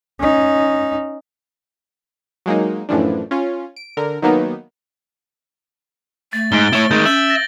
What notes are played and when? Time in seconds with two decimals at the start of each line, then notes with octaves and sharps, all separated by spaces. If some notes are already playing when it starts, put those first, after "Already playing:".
0.20 C#4 D#4
2.46 F#3 G#3 A#3 D#4
2.89 F#2 A2 E3 F3 D4
3.31 C#4 F4
3.76 D7
3.97 D3 A#4
4.22 D#3 F#3 A#3 B3 D#4
6.33 A3 A6
6.52 G#2 A6 D7 G7
6.73 A3 E4 C#5
6.91 D#3 G#3 G6 A6
7.05 C#4 E5 F#7
7.30 A6 A#6